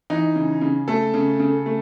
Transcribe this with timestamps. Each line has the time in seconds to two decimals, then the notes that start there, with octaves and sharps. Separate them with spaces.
0.10 E3 D#4
0.36 C#3
0.61 C#3
0.88 A3 A4
1.14 C#3
1.39 C#3
1.66 A3